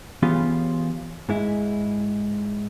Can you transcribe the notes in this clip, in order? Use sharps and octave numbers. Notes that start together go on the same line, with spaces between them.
E3 B3 C#4 F4 G4 G#4
G#2 G#3 E4